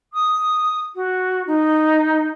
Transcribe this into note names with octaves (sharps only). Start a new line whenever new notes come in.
D#6
F#4
D#4